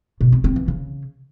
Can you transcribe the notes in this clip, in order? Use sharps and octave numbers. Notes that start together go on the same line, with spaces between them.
B2
C4
C4
E3
C#3